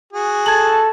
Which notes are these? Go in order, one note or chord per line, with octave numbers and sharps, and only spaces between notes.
F#4 G#4
A4 A5 G#6 F#7